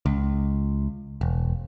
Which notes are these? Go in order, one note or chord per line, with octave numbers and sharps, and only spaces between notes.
C#2
E1